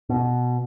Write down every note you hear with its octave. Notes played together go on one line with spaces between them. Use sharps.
B2